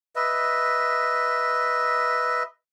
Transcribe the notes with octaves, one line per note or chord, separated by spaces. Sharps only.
B4 D#5 E5